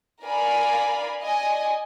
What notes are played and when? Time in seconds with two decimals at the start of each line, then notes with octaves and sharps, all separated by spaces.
0.24 A#4 D5 F5 G#5 B5
1.22 D5 D#5 G#5